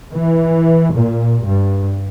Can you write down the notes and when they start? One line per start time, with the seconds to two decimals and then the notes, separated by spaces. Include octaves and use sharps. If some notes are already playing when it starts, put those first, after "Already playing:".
0.17 E3
0.95 A#2
1.44 G2